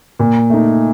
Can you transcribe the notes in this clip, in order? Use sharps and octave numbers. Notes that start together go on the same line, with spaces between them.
A#2
A3 D#4